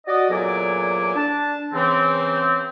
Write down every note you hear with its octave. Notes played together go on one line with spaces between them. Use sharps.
F#4 D5 D#5
E2 A#2 F#3 A4 G#5 D6
D4 A5
C#3 E3 C4